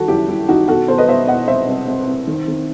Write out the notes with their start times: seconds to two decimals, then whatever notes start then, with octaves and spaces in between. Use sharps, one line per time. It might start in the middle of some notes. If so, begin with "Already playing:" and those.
Already playing: D#3 G3 F#4 A4
0.08 F#1 E4 G4
0.28 G3 E4
0.48 D#3 D#4 F#4
0.68 B2 F#4 A4
0.88 B2 A4 C5
0.98 B4 D#5
1.08 B2 C5 E5
1.27 B2 D#5 F#5
1.48 C2 C5 E5
1.68 C2
1.88 C2
2.07 C2
2.27 D#3
2.48 D#3